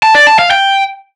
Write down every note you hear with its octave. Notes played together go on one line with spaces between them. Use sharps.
A5
D5
A5
F5
G5